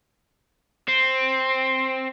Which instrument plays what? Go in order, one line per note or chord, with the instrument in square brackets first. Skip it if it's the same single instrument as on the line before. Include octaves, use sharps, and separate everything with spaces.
[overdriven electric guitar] C4